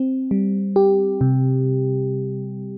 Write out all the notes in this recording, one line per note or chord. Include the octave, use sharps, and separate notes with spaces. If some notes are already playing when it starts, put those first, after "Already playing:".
Already playing: C4
G3
G4
C3